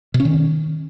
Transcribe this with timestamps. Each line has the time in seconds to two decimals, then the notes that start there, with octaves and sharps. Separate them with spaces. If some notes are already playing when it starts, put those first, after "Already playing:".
0.14 B2
0.20 C#4
0.25 D#3